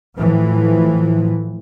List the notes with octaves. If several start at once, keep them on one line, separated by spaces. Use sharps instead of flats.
A2 E3 F3